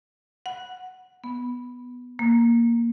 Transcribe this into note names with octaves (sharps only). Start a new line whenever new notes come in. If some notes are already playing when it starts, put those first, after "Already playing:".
F#5
B3
A#3